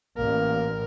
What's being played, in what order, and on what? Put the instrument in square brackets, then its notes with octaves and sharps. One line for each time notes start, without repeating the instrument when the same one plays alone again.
[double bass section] A1 [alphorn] A#3 [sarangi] A#4